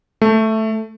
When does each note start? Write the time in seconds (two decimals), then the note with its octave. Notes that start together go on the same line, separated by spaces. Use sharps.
0.22 A3